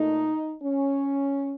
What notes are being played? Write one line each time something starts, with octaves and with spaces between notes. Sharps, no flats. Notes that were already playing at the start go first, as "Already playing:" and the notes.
Already playing: A#2 A3 D#4
C#4